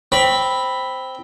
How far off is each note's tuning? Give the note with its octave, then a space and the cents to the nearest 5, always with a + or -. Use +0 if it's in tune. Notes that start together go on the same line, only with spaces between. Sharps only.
C4 +0 B5 +0